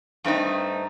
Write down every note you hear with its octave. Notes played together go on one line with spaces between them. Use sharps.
G2 A3 C4 D#4